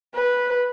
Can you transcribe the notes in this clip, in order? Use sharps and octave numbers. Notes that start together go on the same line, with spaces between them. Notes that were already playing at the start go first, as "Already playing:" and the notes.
B4